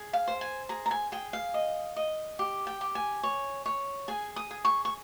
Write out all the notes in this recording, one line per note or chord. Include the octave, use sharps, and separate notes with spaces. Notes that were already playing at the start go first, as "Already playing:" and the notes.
Already playing: G#4
F5
C5
G#5
G#4 A#5
A#5
G#5
G#4 G5
F5
D#5
D#5
G4
G5
G4
G#5
C#5
C#5
G#4 G#5
D#6
G#4
C#6
C#6